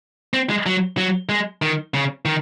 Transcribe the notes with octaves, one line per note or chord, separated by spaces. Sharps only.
C4
G#3
F#3
F#3
G#3
D#3
C#3
D#3